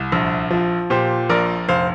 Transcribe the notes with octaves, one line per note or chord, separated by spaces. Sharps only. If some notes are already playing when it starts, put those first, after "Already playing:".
Already playing: C2
A#1
F3
A#2 G4 C5
A#1 A#4 D5
F1 C5 F5